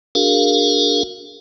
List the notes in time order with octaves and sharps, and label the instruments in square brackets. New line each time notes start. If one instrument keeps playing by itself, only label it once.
[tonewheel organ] D4 F#4 G#4 A#4 F5